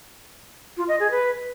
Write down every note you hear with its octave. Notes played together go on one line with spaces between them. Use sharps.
F4
D#5
G#4
B4